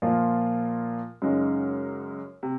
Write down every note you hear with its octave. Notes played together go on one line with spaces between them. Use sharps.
A#2 F3 A#3 F4
F#2 C#3 G#3 D#4
C3